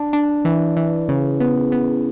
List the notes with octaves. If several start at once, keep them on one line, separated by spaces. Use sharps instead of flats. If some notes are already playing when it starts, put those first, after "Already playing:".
Already playing: D4
D4
E3
E3
C#3
B3
B3